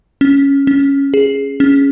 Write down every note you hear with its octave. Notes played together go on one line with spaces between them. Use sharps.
C#4
C#4
G#4
C#4